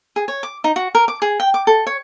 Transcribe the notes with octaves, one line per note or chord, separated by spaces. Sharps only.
G#4
C#5
D6
D#4
F#4
A#4
D6
G#4
G5
D6
A4
C#5